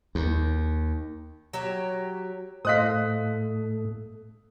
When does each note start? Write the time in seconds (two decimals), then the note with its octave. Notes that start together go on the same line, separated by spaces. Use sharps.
0.15 D#2
1.53 F#3 G4 C#5
2.65 A2 A3 C5 D#5 F5 D#6 F#6 B6